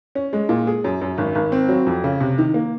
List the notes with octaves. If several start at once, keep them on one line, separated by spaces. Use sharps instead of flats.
C#4
G#3
A#2
G#4
F#2
F#2
G#1
G#1
C4
F#3
F2
C#3
C3
D#3
A#3